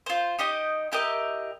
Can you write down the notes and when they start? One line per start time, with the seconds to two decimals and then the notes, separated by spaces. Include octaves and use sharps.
0.06 F4 C5
0.39 D#4 G4 D#5
0.92 E4 G4 A#4 D#5